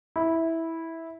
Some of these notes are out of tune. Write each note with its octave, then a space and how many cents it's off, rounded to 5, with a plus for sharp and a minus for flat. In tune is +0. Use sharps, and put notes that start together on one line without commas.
E4 -10